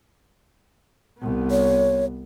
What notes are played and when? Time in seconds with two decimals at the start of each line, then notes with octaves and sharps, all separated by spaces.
1.18 C2 B3
1.51 C#5